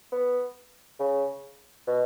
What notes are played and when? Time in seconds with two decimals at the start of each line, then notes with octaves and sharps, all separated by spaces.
0.12 B3
1.00 C#3
1.87 B2